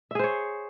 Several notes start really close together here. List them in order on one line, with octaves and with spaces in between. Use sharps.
E5 G#4 C5 C#5